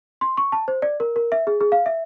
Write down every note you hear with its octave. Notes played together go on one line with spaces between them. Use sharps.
C6
C#6
A5
C5
D5
A#4
A#4
E5
G#4
G#4
F5
E5